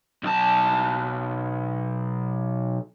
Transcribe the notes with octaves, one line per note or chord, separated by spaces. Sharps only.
B1 A5